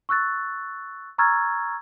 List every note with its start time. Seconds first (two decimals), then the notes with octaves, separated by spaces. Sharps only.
0.09 C#6 E6 F#6 A6
1.18 A#5 C#6 E6 F6 G#6 A6